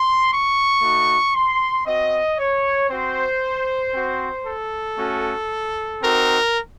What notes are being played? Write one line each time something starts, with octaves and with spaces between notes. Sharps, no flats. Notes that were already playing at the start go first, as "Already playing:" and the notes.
Already playing: C6
C#6
A3 D#4 F#4
C6
C4 F#4 D#5
C#5
C4 F#4 C5
C4 F#4
A4
A3 C#4 F#4
C4 D#4 F#4 A#4